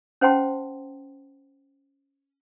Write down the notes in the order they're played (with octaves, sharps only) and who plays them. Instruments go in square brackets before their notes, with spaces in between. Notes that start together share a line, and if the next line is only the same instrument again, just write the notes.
[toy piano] C#4 C5 F#5 G5 A5 C6